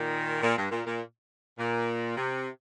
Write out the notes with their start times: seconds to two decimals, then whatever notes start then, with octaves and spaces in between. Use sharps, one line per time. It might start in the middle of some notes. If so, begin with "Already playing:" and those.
Already playing: A#2 D#3
0.42 A#2
0.57 G2
0.72 A#2
0.86 A#2
1.59 A#2
2.17 C3